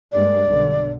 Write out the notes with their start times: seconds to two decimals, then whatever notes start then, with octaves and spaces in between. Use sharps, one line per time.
0.12 G2 G#3 A#3 D5
0.48 B1 D3